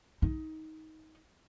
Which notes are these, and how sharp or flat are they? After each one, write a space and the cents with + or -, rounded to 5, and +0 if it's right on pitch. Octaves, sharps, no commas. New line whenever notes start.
D#4 +20